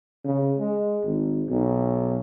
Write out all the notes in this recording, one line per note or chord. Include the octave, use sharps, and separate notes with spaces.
C#3
G#3
G#1
B1